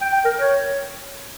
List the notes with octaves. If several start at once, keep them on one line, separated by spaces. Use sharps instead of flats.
G5
G5
A#4
C#5